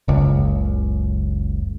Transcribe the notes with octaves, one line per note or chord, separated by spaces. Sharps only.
F#1 C#2